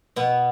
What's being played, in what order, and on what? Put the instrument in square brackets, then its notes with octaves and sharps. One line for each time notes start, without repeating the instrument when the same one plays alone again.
[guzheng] B2 B3